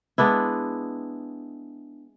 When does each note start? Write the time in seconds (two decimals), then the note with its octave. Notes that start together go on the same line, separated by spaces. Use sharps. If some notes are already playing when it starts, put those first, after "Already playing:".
0.18 G#3 B3 D4 E4